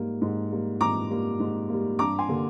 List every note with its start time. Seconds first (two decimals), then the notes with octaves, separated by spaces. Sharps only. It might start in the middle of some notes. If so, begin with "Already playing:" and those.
Already playing: G#2 G3 A#3
0.22 G#2
0.51 G3 A#3
0.80 G#2 A#5 D6
1.10 G3 A#3
1.40 G#2
1.70 G3 A#3
1.99 G2 A#5 D6
2.18 G#5 C6
2.29 D3 G3 A#3